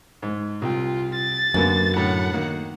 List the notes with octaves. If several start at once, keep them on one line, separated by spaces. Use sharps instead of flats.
G#2
C2 F4 G5
A6
F#2 D3 A#3 B3
A2 D3 F#5
D#3 A#3